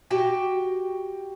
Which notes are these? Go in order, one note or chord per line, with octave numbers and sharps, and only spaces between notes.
F#4 G4 G5